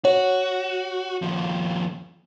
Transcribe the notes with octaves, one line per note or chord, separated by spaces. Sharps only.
F#4 C#5
D#2 F3